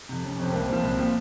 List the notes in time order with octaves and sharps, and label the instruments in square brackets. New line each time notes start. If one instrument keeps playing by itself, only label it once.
[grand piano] F2 C3
[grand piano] F1 [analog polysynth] C#4
[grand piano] F2 C3 [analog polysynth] C4
[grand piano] C2 [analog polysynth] A#3
[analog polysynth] C4
[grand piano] A#2 F3
C2
[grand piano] A#2 F3 [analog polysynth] A#3